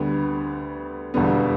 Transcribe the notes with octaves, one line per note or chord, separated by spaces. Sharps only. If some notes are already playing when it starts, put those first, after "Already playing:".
Already playing: D2 D3 G3 B3
E1 E2 D3 G3 B3